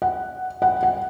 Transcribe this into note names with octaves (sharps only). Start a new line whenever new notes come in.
F#5
F#5
F#5